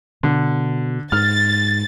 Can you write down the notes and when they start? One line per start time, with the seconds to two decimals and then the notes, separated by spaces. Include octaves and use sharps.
0.23 B2 D3
1.12 G#2 F6 A6